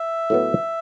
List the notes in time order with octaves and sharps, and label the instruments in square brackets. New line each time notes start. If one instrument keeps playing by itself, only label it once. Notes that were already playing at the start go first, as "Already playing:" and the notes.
Already playing: [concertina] E5
[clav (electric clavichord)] A2 F#3 B3